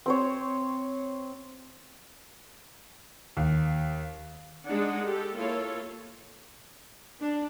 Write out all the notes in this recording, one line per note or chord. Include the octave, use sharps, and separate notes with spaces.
C4 C5 C#5
D#2
G#3 D4 D#4 F#5
G4 A4
A#3 E4 F4 A4 C#5
D4